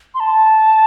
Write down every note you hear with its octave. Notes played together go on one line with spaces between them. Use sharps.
C6
A5